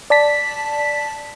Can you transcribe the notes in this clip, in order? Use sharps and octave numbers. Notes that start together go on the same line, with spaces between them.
D5 A5 B6